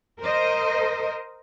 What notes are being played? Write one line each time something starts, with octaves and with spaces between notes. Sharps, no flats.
A#4 C5 D#5